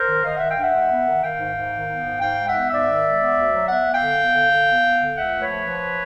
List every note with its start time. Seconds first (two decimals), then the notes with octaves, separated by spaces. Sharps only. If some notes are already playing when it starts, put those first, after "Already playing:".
Already playing: A#4 C5
0.08 D#3
0.24 D#3 D#5 F5
0.37 D#3 E5 F#5
0.49 F5 G5
0.58 G2 E5 F#5
0.74 G#3
0.90 B3
1.07 D#3
1.23 D#3 F5 G5
1.39 G#2
1.55 G#2
1.72 D#3
1.89 B3
2.05 G#2
2.21 G#2 F5 G5
2.38 G#3
2.46 E5 F#5
2.54 B3
2.70 G#2 D5 E5
2.87 D#3
3.04 G#3
3.20 B3
3.37 D2
3.53 F#3
3.68 B3 E5 F#5
3.85 B3
3.93 F5 G5
4.02 D3
4.19 B3
4.35 D3
4.51 D3
4.67 B3
4.83 B3
5.00 D3
5.16 C#2 E5 F#5
5.33 A3
5.41 B4 C#5
5.49 F3
5.66 F3